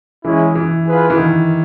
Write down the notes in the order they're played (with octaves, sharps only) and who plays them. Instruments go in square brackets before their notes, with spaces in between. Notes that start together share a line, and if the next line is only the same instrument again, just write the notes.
[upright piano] E3 [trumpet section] G#3 C#4 E4 G#4
[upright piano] E3
[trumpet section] F4 G#4 B4
[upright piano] E3
D#3